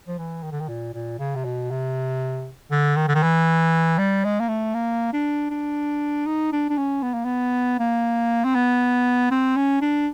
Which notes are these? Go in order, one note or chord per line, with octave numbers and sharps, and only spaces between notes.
F3
E3
D#3
D3
D#3
A#2
A#2
C#3
C3
B2
C3
D3
D#3
D3
D#3
E3
G3
G#3
A#3
A3
A#3
D4
D4
D#4
D4
D4
C#4
B3
A#3
B3
A#3
C4
B3
C4
C#4
D4